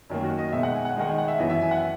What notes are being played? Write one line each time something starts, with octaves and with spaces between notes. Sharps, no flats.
F#2 D#3 A#3
F#4
D#5
B2 G#3 D#4 E5
F#5
G#5
F#5
D#3 G#3 D#4 F#5
G#5
F#5
E5
F#2 E3 B3 D#5
E5
G#5
F#5